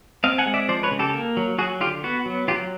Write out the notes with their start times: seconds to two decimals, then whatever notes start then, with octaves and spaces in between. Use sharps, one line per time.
0.24 C4 D#5 F5
0.38 F#5 G#5
0.46 G#3
0.54 D5 E5
0.69 F3 C5 D5
0.83 B4 C#5
0.91 C#3
0.99 G4 A4
1.14 A#3
1.37 F#3
1.58 F#3 F#4 G#4
1.80 D3 F4 G4
2.04 B3 F#4
2.26 F#3
2.48 F#3 F4 G4